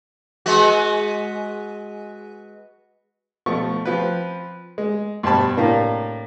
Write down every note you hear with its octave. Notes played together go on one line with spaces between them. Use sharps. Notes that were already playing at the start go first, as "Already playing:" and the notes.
G#3 B3 F#4
B2 F3 A3 C#6
F3 C4 B4
G#3
G2 B2 C5 A5 B5
A2 C3 A#3 D4